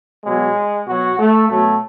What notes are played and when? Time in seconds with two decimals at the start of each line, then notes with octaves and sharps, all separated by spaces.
0.25 B2 F#3 G#3
0.87 B2 F#3 F#4
1.19 A3
1.50 B2 F#3 A3